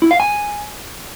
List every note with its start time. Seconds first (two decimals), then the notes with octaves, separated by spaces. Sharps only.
0.02 E4
0.11 F5
0.20 G#5